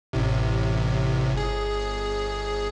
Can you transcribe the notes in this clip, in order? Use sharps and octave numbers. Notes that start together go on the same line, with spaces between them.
A1 A2 C3
G1 G#4